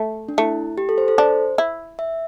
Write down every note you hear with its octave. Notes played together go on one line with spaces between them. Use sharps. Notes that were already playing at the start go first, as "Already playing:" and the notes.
Already playing: A3
D4
A3 E4
G4
A4
C5
A4
D4 C5
E4
E5